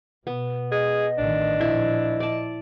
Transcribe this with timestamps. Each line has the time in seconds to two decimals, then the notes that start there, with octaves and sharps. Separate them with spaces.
0.27 B2 B3
0.72 G#4 D#5
1.18 A1 D#3 D4
1.61 A#2 F3 E4
2.20 D5 A5